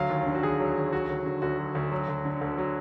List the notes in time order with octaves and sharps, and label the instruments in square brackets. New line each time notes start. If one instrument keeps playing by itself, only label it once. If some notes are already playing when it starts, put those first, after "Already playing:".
Already playing: [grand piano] D2 F#3 F5
D#2
D3
F#4
D#2 G#4
F#3
D#2
F#3 F#4
D2
D3
D2 F#4
F#3
D2
F#3
D2
D3
D2
F#3